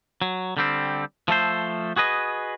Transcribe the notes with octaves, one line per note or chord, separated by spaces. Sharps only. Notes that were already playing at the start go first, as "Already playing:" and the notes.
F#3
D3 G3 C4
F3 A3 A4 C5
F#4 G#4 B4 D#5